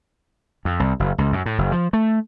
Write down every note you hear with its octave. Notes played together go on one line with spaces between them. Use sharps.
F2
C2
F#1
C#2
F#2
A2
F#1
F3
A3